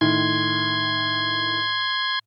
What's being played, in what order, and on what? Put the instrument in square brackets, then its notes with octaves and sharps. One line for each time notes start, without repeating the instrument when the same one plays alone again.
[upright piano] A2 D#3 [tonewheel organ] C6 G#6